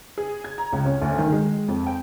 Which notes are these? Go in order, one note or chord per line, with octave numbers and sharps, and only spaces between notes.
G#4
G#6
A#5
C#2
C#4
D2
D#3
G#3
F2
G5